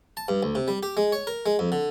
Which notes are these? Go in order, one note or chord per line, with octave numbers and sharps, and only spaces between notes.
A5
G2
D2
C3
G3
G4
G#3
C#5
A#4
G#3
F2
D3